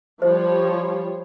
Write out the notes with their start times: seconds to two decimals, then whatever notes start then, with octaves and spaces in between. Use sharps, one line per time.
0.22 F3 G3 C5 C#5